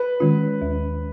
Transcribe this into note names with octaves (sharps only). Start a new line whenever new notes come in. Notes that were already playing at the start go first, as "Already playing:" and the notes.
Already playing: B4
D#3 G#3 C#4 F4
D#2